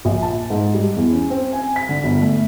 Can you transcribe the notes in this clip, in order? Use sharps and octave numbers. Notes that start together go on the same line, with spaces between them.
A#1
A5
G#2
G3
E2
C#4
C4
G#5
B6
D3
G1
A3